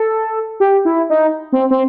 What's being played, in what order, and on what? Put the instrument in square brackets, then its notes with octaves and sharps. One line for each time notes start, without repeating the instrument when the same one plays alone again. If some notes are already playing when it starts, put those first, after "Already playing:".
Already playing: [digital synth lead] A4
G4
E4
D#4
C4
C4